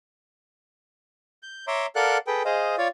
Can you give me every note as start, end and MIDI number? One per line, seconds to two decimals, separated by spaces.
1.43 1.66 91
1.67 1.86 73
1.67 1.86 76
1.67 1.86 82
1.67 1.86 84
1.67 1.86 86
1.96 2.18 69
1.96 2.18 70
1.96 2.18 74
1.96 2.18 77
1.96 2.18 78
1.96 2.18 90
2.27 2.43 68
2.27 2.43 69
2.27 2.43 71
2.27 2.43 79
2.45 2.76 68
2.45 2.76 72
2.45 2.76 75
2.45 2.76 77
2.78 2.88 65
2.78 2.88 73
2.78 2.88 74
2.78 2.88 77